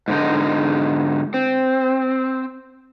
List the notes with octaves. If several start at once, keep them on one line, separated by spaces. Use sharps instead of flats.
G#2 D3 D#4
C4